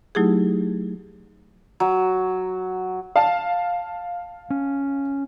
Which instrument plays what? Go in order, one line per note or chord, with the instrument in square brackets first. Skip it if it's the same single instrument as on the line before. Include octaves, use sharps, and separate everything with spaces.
[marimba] F#3 A3 D#4 E4 G4 G#4
[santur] F#3
[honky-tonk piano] F5 A5
[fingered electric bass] C#4